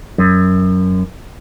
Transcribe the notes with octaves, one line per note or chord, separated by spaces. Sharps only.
F#2